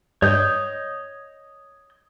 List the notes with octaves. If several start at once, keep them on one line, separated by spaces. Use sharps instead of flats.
G2 C#5 D#5 G6